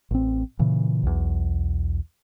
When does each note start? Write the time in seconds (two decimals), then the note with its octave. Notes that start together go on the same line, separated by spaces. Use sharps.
0.11 A1 C4
0.59 A#2 C#3 E3
1.03 B1 E2